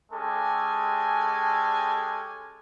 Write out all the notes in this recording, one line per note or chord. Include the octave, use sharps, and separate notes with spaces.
G#3 C#4 G4 A4 G#5